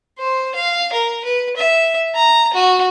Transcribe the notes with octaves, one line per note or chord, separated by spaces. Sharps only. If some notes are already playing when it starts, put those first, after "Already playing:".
C5
F5
A#4
B4
E5
A#5
F#4